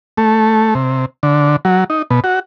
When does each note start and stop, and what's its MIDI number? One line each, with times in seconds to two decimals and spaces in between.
0.17 0.74 57
0.75 1.05 48
1.23 1.56 50
1.65 1.84 54
1.90 2.02 63
2.10 2.20 47
2.24 2.39 66